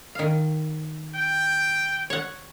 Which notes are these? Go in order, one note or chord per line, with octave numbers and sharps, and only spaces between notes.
D#3 F5
G5
C#5 F#5